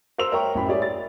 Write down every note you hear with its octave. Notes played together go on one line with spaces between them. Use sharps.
A#4 C5 C6 E6 F7
A#4 C#5 E5 G5 A#5 C#6
A1 F#2 G5 B5
G4 G#4 C#5 D5 E5
A6